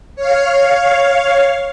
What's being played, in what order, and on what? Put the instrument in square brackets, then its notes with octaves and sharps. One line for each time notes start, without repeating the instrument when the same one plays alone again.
[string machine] C#5 F5